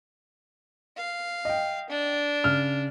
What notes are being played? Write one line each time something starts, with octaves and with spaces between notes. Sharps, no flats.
F5
D#5 G5
D4
C#3 F6